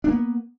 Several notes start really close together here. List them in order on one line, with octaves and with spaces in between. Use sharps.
D4 A#3 B3